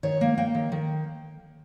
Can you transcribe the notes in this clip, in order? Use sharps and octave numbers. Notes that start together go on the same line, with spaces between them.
D#3 C#5
A#3
A#3 G5
D#3
D#3